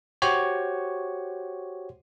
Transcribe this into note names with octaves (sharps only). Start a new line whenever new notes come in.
F#4 G4 C5 C#5